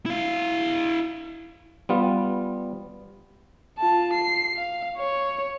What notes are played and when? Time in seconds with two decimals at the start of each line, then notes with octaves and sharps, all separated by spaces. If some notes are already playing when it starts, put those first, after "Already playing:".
0.06 E4 F5
1.89 G3 B3 F4
3.79 F4 A5
4.14 C7
4.56 F5
4.98 C#5